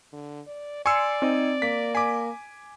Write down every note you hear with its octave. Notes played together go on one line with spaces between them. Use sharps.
D3
D5
D5 G#5 C6 E6 C7 C#7
C4 D#4
A#3 B6
G#5 D6 B6